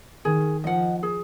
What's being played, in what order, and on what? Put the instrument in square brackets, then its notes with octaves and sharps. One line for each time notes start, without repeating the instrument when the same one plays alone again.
[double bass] D#3 [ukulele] G#4
[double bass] F3 [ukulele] D#5 F#5
[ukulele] G#4